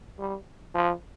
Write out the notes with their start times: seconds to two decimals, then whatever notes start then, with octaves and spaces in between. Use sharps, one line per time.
0.19 G3
0.75 F3